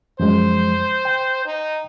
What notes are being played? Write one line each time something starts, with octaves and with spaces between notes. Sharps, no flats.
F#2 F3 G#3 C5
G5
D#4